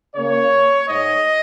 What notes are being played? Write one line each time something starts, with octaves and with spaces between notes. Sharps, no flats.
C#3 A#3 C#5
G#2 G#3 D#5